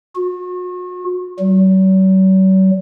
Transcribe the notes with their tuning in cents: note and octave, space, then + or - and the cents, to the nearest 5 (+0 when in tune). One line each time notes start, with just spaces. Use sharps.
F#4 -40
F#3 +45